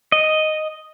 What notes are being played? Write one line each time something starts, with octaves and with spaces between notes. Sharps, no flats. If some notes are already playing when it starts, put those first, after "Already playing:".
D#5